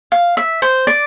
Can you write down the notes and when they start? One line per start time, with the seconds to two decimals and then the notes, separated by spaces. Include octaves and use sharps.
0.12 F5
0.37 E5
0.62 C5
0.87 D5